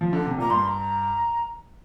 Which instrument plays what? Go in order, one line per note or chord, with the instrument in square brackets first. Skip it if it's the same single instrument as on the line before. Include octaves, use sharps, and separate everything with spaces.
[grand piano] F3
D3
C3
[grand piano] A#2 [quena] A#5
[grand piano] G2 [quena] C6
[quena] A#5